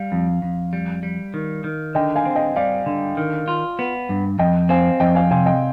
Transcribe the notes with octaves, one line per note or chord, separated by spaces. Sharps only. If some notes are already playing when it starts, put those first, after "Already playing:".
Already playing: G3 F5
F2
F2
G3
G3
D#3
D#3
D3 D#5 G5
F5 G#5
C4
D#5 G5
G3 D5 F5
D3
D#3
F4
B3
G2
F2 D#5 G5
C4 F5 G#5
F2 D#5 G5
F5 G#5
C3 F5 G#5
D#5 G5